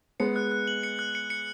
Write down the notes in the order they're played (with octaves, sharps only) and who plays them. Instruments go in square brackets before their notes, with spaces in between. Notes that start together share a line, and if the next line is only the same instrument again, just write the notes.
[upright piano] G#3 B3 [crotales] C#7
[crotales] F#6
F#6
F#7
C#7
F#6
C#7
C#7